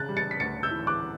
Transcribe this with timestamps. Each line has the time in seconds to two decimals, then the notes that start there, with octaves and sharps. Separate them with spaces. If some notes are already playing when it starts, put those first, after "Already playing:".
Already playing: C#3 F#6 A6
0.09 G3
0.17 A6 C#7
0.31 B6
0.40 D2 A6 C#7
0.63 E6 G6
0.71 E3
0.87 D6 F#6